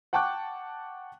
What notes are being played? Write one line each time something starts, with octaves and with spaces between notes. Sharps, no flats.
F#5 G5 A5 C#6 D6 F#6